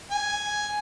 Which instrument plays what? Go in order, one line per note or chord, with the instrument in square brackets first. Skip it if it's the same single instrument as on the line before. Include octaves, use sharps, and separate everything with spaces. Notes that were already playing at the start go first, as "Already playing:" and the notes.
[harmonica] G#5